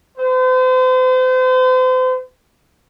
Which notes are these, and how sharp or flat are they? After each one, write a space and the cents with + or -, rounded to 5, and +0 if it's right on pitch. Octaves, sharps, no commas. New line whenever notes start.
C5 -40